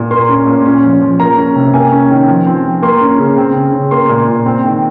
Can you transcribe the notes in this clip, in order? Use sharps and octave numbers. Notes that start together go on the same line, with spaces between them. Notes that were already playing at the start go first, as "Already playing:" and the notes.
Already playing: A#2
A#3 C6
C#4
A#2
C#4
F3
F3
A#3 A#5
C#4
C3
A#3 G#5
C#4
D#3
F3
C4
F3
A#3 C6
C#4
C#3
C4
C#3
C#3
A#3 C6
A#2
A#2
C4
D#3